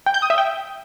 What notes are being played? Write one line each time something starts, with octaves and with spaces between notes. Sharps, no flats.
G5
G6
D#6
E5
G5